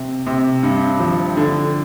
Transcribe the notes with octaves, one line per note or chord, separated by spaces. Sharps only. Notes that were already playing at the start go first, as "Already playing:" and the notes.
Already playing: C3
C3
G2
F3
D3